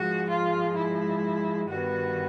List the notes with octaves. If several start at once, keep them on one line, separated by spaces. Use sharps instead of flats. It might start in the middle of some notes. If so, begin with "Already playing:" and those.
Already playing: G#2 F3 G#3 F#4
F4
E4
G2 D#3 G3 B3 F#4